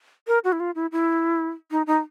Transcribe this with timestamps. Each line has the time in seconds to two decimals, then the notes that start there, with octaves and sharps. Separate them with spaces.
0.27 A#4
0.44 F#4
0.52 E4
0.60 F4
0.75 E4
0.92 E4
1.71 D#4
1.87 D#4